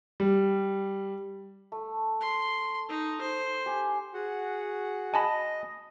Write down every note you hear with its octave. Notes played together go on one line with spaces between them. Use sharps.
G3
A3
C6
D#4
C5
G4 G#5
F#4 G#4 F#5
D#5 G#5 A5 B5